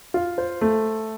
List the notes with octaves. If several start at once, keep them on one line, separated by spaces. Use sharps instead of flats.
F4
C5
A3